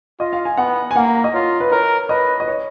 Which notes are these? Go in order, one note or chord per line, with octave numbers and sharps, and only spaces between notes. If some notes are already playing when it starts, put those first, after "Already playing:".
F4 D#5
F5
G#5
B3 F#5
G#5
A#3 F#5
A#5
A#5
D#5
F4 C#5
B4
A#4 C#5
B4 D#5
D#5
C#5